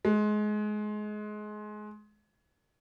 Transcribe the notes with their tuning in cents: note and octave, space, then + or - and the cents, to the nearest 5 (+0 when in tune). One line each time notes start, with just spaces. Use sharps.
G#3 +25